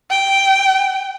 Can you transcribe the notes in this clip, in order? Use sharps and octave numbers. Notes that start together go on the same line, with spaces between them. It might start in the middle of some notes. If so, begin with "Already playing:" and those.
G5